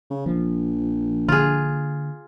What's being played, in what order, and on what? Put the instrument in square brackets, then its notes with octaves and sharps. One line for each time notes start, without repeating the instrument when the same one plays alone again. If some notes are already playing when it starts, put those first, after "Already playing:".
[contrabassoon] C#3
[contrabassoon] A#1 [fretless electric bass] F3
[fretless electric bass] D3 A#3 [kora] F4 G#4